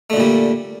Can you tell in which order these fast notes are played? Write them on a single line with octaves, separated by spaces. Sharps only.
A3 D3 A#2 G3